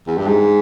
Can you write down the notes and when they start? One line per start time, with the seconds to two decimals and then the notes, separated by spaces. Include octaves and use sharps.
0.07 E2
0.17 G2
0.27 G#2